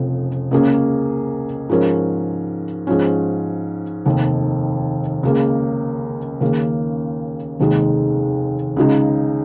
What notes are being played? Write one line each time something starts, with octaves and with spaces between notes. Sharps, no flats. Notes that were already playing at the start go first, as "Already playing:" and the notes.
Already playing: F1 F2 C#3 F3
C#2 C#3 A#3 C#4 G#4
G#2 F3 C#4 A#4
G#2 F3 C#4
F1 D#2 D#3
C#2 C#3 A#3
D#2 C#3 A#3
F1 D#2 D#3 G#3
C#2 C#3 G#3 D#4 G#4